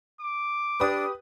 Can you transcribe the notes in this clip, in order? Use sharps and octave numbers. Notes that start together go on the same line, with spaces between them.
D6
D4 G4 B4 D#6